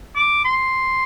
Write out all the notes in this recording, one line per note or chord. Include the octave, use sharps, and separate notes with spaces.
D6
C6